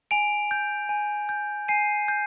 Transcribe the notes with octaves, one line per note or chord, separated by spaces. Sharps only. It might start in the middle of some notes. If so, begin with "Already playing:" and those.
G#5 D7 F7
G6
G#5
G6
G#5 C7 D#7
G6